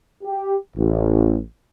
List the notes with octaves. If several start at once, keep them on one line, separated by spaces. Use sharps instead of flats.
G4
A1